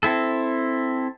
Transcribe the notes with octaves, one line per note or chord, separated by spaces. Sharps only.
C4 E4 A4